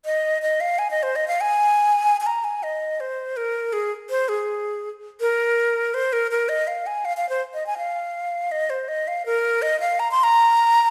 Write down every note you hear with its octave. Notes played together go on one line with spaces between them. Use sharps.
D#5
D#5
F5
G#5
D#5
C5
D#5
F5
G#5
G#5
A#5
G#5
D#5
C5
A#4
G#4
C5
G#4
A#4
C5
A#4
A#4
D#5
F5
G#5
F5
F5
C5
D#5
G#5
F5
D#5
C5
D#5
F5
A#4
D#5
F5
A#5
C6
A#5